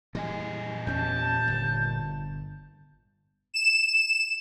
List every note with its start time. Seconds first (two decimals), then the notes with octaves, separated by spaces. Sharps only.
0.15 A#2 E3 G3 D#5 G#5
0.87 E2 C#4 A5 G6
1.48 G1
3.54 E7